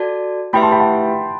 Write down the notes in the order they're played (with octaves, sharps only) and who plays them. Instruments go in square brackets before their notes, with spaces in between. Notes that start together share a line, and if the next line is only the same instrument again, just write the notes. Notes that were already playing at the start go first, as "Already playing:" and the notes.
Already playing: [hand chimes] F#4 A4 D5 A5
[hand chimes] A3 E4 G4 B4 E5 [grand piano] G5 B5
[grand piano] A5 C6
G5 B5
F#5 A5